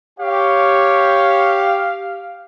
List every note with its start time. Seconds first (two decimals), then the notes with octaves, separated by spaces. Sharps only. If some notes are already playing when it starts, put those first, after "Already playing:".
0.20 G4 C#5 F5